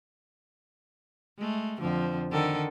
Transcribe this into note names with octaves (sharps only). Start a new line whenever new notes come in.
G#3 A3
F2 D3 F3
D3 D#3 A4